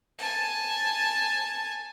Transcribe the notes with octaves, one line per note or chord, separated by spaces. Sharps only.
G#5 A5